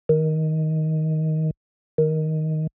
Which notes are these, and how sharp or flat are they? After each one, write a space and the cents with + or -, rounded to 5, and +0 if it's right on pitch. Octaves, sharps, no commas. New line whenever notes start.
D#3 +15
D#3 +10